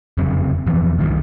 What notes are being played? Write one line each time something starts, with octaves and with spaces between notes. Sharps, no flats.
F1 F#2 C#3 C4
E1 E3 F3 B3
C2 G2 D#3 F3